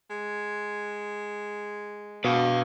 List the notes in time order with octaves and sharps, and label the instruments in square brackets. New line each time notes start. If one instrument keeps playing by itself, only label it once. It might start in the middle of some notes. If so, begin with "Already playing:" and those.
[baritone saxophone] G#3
[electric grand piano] B2 [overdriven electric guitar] B4 F5